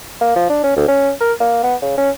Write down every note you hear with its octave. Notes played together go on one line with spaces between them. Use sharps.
A#3
F3
D4
C#4
D2
C#4
A#4
A#3
B3
C#3
C#4